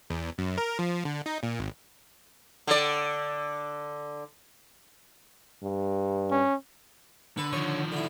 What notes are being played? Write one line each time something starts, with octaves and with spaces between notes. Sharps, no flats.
E2
F#2
A#4
F3
D3
D#4
A#2
G#1
D3 D5
G2
C#4
D3 B4
D#3 F3 C#5
D3 E4